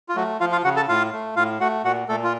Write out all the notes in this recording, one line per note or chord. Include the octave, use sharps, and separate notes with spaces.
F4
F#3 A3 F#4
F3 F4 F5
F4 F5
C#3 F#4 F#5
A4 A5
A2 F4 F5
A3
A2 F4 F5
A3 F#4 F#5
A#2 F#4 F#5
A#2 A3 A4
F4